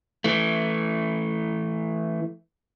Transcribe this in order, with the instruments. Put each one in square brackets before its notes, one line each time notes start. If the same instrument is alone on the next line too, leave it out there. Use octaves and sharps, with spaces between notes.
[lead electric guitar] E3 A3